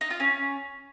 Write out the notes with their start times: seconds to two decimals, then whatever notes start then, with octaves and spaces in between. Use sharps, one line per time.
0.01 D#4
0.10 F4
0.20 C#4